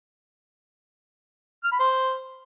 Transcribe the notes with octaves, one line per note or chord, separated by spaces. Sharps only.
F6
B5
C5